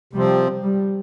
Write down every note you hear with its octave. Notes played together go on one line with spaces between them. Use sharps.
C3 F3 G3 C4
G3